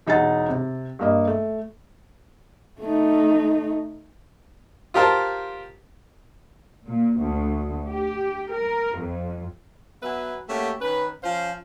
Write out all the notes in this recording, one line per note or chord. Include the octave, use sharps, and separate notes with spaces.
E1 D#4 G#4 F#5 A6
C3
G2 A#3 D#5
A3
A3 D#4
F4 G4 A#4 C5 A5
A#2
D2
G4
A#4
F2
F#3 B3 B4 E5 G#5
A3 A#3 C#4 F#4 G4
D#3 C#4 B4
F3 C#4 C5 F5